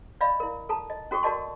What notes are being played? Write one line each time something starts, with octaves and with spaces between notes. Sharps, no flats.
D5 D#5 F5 B5
E4 A#4
A4 A5 A#5
D#5
C#4 F#4 A4 G5 C#6
F#4 A#4 D5 D#5 A5 C6